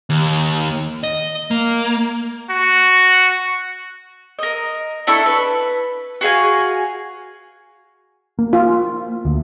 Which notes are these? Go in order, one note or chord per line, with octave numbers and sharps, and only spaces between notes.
D#2
D#5
A#3
F#4
A#4 D#5
D4 E4 A4 C#6
B4
F#4 G#4 F5 G#5
A#3
F4
D2